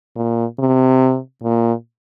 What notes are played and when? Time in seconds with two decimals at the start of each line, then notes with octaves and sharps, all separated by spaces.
0.16 A#2
0.59 C3
1.43 A#2